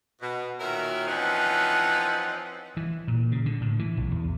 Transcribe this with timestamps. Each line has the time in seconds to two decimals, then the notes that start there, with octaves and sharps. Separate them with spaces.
0.22 B2
0.60 A#2 D#3 F#4 A#4 C#5 E5
1.07 E3 F3 C4 C#4 D#4 F#5
2.77 E3
3.08 A#2
3.32 C#3
3.46 D3
3.61 A2
3.79 E3
3.97 B1
4.11 E2